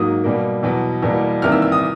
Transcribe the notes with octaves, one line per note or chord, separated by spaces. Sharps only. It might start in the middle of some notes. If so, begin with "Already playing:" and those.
Already playing: G#2 F#3 A#3 D#6
B2 G3 A#3
E2 B2 F#3
E2 B2 G3 A#3
E2 C3 D#3 G3 A#3 F6
E6
E6
D#6